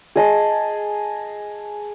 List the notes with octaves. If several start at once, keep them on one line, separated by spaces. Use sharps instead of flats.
G#4 D#5 A5